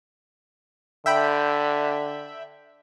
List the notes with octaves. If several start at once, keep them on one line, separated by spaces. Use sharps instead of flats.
D3 E5 G5 B5